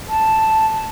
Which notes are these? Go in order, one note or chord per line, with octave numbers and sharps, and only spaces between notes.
A5